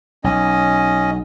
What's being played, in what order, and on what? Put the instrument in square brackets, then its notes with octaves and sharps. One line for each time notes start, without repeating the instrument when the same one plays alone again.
[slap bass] B1 [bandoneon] C#4 D#5